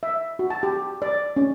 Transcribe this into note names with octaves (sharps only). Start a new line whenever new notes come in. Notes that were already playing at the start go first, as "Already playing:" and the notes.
E5
F#4
A5
G4
D5
C#4